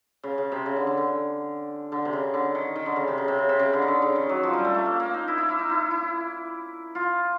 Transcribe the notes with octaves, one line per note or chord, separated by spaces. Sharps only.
C#3
C#3
C3
C#3
D3
D3
D3
D3
C3
C#3
D3
D#3
D#3
D3
C#3
C3
C#3
C3
C#3
C3
C#3
D3
D#3
D3
C#3
D#3
F#3
F3
G3
A3
A3
A#3
A#3
D#4
E4
E4
E4
D#4
E4
E4
F4